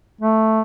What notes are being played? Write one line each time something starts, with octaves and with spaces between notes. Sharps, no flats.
A3